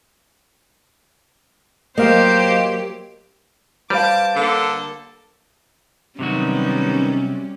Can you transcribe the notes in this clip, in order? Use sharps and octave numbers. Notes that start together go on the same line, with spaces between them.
F#3 A#3 G4 C5 D#5 F5
G3 B4 C5 F5 A5 D6
D3 A#3 A4
C3 D#3 F#3 G3 B3 C#4 D#4 F#4